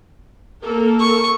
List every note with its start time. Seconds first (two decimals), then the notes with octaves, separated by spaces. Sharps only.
0.62 A#3 A4 A#4
1.01 C#6